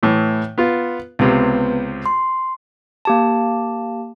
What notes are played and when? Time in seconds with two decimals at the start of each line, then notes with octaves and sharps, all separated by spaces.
0.03 A2 E3
0.58 B3 F4
1.19 C#2 C3 B3 B4
2.06 C6
3.05 A#3 G4 A5